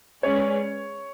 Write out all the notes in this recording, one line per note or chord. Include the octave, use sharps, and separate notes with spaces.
G#3 C#4 G#4 B4 C#5 D5